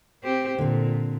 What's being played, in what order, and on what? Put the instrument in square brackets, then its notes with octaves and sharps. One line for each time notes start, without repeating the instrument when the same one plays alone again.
[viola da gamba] C4 G4 C5
[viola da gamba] A#2 [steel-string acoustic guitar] D3 C4